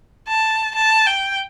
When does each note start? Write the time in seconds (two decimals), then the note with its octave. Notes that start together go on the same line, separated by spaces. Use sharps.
0.28 A5
0.75 A5
1.06 G5